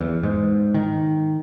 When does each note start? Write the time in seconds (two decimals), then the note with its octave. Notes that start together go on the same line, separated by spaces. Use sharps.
0.01 E2
0.23 G#2
0.74 D#3